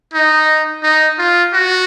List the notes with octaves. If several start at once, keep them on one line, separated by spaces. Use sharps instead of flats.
D#4
D#4
F4
F#4